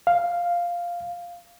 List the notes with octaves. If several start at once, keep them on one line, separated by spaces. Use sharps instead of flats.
F5